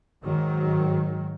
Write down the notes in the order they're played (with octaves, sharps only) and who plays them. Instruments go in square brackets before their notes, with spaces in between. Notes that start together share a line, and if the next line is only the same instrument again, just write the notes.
[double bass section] G#2 D#3 F#3